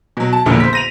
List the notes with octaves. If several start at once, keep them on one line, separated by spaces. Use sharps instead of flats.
B2 F#3
A5
E1 A#1 A#2 D3
C5 B6
A#6 D#7 F7